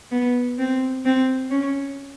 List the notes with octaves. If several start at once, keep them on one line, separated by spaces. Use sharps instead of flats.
B3
C4
C4
C#4